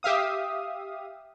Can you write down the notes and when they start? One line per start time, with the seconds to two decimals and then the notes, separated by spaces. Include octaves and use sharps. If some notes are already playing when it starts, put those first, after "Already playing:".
0.03 G4 E5 F5 D#6